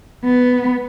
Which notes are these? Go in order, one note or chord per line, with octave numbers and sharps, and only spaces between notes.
B3